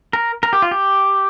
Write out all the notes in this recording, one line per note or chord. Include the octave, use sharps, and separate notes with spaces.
A#4
A#4
G4
F4
G4